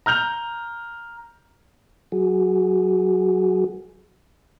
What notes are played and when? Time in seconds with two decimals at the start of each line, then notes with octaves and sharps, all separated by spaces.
0.06 A#5 F6 G6 F7
2.12 F#3 F#4 G#4